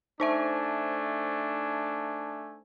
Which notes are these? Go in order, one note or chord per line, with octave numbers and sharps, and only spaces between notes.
A3 D4 D#4 C5 E5 G#5